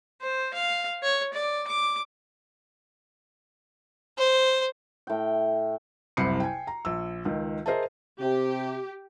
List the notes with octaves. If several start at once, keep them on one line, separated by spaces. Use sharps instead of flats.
C5
F5
C#5
D5
D6
C5
A2 G5
F#1 C2 C3 B5 C7 C#7
G5 G#5
A#5
A#1 E6
C#2 D#3
G#4 A#4 C5 D#5 E5 A5
C3 G4